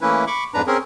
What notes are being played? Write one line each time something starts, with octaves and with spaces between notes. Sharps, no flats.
E3 A3 A#3 C#4 E4 B4
B5 C#6 D6
F2 G#2 D4 B4 A#5
C4 C#4 G#4 A#4